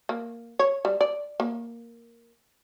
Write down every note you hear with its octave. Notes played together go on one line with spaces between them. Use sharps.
A#3
C#5
G3
D5
A#3